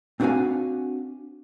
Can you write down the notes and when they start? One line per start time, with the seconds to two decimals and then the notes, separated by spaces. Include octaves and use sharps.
0.20 C4 D4 F#4 B4 F5 G#5